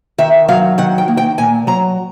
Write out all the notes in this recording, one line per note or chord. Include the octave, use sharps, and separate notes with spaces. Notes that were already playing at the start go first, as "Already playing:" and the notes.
D#3 E5
F#3 F5
D#3 F#5
G5
A#3
G5
A#2 G#5
F#3 A#5